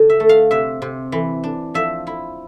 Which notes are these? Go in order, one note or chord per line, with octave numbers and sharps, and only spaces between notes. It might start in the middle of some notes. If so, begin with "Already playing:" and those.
Already playing: D3
E5
A3
F5
C3 E5
C3
E3
D4
F3 E5
E4